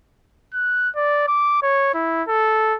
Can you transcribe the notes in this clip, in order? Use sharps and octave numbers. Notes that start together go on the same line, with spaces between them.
F#6
D5
D6
C#5
E4
A4